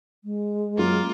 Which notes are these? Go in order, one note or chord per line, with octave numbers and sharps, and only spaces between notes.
G#3
F#2 A#3 F4